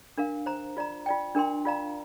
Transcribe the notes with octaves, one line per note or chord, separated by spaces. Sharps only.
D4 A#4 F5
C5 A#5
F4 D5 A#5
F4 D5 G5
D4 A#4 G5 C6
F4 D5 F5 A#5